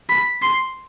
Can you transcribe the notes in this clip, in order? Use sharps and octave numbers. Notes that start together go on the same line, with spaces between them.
B5
C6